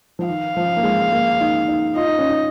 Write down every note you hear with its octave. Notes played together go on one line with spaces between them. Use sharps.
F3
D#3 F5
F3
A#3
G#3
A#3
D#4
D#4
F4 D#5
D#4
C#4
D#4